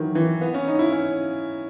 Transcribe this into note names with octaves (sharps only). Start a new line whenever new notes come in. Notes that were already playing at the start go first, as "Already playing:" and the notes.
Already playing: D#3 E3 F#3 E4
E3
B3
C#4
D#4
E4
C#4